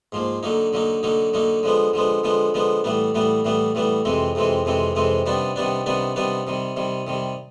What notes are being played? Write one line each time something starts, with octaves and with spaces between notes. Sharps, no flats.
G#2 F3 A#3
D3 F#3 A#3 D#4
D3 F#3 A#3 D#4
D3 F#3 A#3 D#4
D3 F#3 A#3 D#4
D3 F3 G#3 B3
D3 F3 G#3 B3
D3 F3 G#3 B3
D3 F3 G#3 B3
A2 E3 G3 B3
A2 E3 G3 B3
A2 E3 G3 B3
A2 E3 G3 B3
F2 C3 E3 G#3 C4
F2 C3 E3 G#3 C4
F2 C3 E3 G#3 C4
F2 C3 E3 G#3 C4
C3 D#3 G3 B3 D4
C3 D#3 G3 B3 D4
C3 D#3 G3 B3 D4
C3 D#3 G3 B3 D4
C3 D#3 G3
C3 D#3 G3
C3 D#3 G3